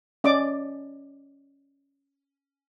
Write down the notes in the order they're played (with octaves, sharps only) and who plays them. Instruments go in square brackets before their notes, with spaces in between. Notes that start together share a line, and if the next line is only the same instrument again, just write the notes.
[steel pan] C#4 D5 D#5 D6